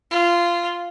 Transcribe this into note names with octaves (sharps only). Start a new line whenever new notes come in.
F4